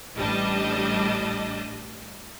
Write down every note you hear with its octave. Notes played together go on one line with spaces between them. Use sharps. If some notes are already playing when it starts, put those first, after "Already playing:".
A1 G3 D4 D#5